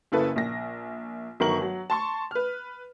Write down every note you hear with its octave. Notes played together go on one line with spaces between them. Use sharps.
F#1 C#3 E4 A4 B4
A#1 A#6
G1 D#3 F#3 A#4 C#6 F#7
F#3
A5 C6 C#6
B4 F6